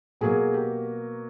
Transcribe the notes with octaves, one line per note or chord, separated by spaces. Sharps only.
B2 F#3 A#3 G#4
G4